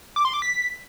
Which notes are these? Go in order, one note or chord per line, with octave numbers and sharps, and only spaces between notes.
D6
C6
D6
B6